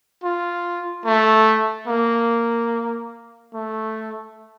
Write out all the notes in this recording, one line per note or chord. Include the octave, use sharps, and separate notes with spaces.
F4
A3
A#3
A3